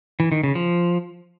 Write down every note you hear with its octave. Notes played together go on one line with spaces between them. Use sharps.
E3
D#3
C#3
F3